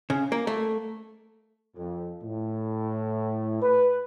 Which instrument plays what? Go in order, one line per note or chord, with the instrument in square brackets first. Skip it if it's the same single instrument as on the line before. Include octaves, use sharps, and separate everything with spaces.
[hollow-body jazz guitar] C#3
A#3
A3
[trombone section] F2
A2
B4